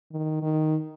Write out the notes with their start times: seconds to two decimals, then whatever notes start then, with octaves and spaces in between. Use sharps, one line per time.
0.12 D#3
0.43 D#3